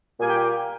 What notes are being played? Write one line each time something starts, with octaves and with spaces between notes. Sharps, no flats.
A#2 G3 A#3 G#5
G5